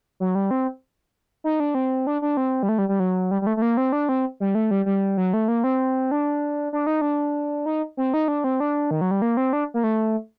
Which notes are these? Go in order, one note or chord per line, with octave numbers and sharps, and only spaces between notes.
F#3
G3
C4
D#4
D4
C4
D4
D4
C4
G3
A3
G3
G3
F#3
G3
G3
A3
A3
A#3
C4
D4
C4
G3
A3
G3
G3
F#3
A3
A#3
C4
D4
D4
D#4
D4
D#4
C4
D#4
D4
C4
D4
D#3
F#3
G3
A#3
C4
D4
A#3
A3